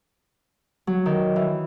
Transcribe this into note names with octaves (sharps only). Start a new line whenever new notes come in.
F#3
D#3
E3